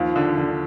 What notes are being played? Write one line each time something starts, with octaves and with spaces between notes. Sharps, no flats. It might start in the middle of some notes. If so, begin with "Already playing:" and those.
Already playing: D#2 F3
D3
D3